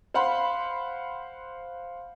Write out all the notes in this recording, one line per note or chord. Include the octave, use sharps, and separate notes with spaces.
C5 F5 F#5 B5 C6